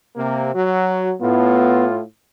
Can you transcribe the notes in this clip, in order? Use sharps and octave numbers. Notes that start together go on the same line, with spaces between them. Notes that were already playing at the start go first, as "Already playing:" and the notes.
C3 A#3
F#3 F#4
A2 B3 F4